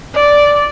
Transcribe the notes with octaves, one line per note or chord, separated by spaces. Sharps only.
D5